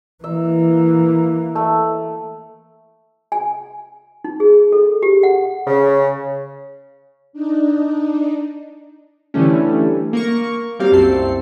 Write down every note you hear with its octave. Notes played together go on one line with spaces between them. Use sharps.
E3 A#3 E5
A3
G#5
D#4
G#4
A4
G4
F#5
C#3
D4 D#4
D3 E3 G3 A3 C#4
A#3 A#4 C#6
F#3 G3 A#3 C4 G4 F5
C2 F#2 A3 C4 A4 C7